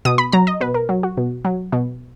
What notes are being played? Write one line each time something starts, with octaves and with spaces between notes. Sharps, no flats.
B2 D#6
B5
F#3 A#5
D#5
B2 B4
A#4
F#3
F#4
B2
F#3
B2